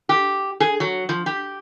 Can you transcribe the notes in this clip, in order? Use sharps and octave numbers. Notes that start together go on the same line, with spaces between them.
G4
G#4
F#3
F3
G4